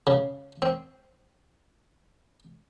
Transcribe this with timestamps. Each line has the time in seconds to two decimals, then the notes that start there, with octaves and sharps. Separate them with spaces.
0.07 C#3
0.62 C4